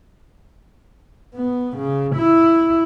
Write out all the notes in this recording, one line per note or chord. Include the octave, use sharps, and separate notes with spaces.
B3
C#3
E4